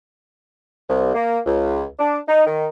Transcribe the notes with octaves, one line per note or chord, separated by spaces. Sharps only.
C2
A#3
C#2
D4
D#4
D#3